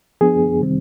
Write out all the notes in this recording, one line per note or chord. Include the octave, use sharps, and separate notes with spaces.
F3 B3 D4 G#4
C3 D#3 G3 C4